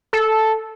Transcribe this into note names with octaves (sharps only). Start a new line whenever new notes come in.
A4